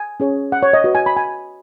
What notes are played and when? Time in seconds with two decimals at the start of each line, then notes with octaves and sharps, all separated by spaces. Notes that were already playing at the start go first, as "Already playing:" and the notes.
Already playing: G#5
0.20 C#4 G#4 C#5
0.52 F#5
0.63 C#5
0.73 D#5
0.84 F#4 B4
0.95 G#5
1.06 B5
1.17 G#5